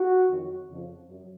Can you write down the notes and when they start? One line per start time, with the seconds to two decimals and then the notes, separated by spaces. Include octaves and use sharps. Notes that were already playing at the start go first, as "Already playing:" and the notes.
Already playing: F#4
0.30 F2 D#3 F#3
0.69 F2 C#3 F3
1.07 F#2